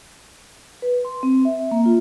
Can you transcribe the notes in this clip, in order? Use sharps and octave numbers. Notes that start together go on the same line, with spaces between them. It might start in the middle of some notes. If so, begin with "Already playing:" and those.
B4
C6
C4
E5
E5
A#3
F4